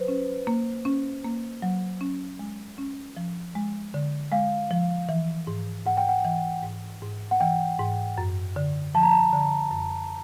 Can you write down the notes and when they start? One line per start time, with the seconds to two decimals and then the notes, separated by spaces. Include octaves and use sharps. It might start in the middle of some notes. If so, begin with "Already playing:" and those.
Already playing: F#3 B4 C5
0.08 C#4
0.47 A#3
0.85 C#4
1.24 A#3
1.62 F#3
2.01 C#4
2.39 G#3
2.78 C#4
3.17 F3
3.55 G#3
3.94 D3
4.32 G#3 F5
4.71 F3
5.09 E3
5.47 G#2
5.86 G#2 F#5
5.97 G5
6.09 F#5
6.25 E3
6.63 G#2
7.02 G#2
7.31 F#5
7.40 E3 G5
7.79 G#2
8.18 F#2
8.56 D3
8.95 F3 A5
9.03 A#5
9.11 A5
9.33 D3
9.71 F#2